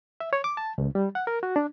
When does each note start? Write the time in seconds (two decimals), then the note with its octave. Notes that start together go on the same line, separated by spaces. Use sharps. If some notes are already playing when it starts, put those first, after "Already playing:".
0.20 E5
0.33 C#5
0.44 D6
0.57 A5
0.78 C#2
0.95 G3
1.15 F#5
1.27 A#4
1.43 F#4
1.56 D4